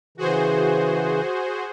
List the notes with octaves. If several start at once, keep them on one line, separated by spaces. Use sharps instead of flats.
C#3 E3 F#4 G#4 C5